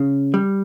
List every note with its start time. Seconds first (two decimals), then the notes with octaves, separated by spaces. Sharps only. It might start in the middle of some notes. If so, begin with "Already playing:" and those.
Already playing: C#3
0.34 G3